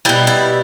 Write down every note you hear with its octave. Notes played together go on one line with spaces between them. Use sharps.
B2 G3 E4
E4